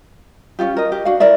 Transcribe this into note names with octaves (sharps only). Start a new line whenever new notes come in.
C#4 D#4 F4 G4
A#4 D#5
G4
D4 F#4 F5
E4 A#4 D5 E5